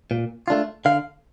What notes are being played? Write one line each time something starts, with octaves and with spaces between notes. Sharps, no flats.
A#2
A3 D4 F4
D3 F5